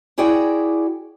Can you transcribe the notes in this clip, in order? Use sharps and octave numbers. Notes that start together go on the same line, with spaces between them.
E4 F#4 G#4 D5 F#5 G5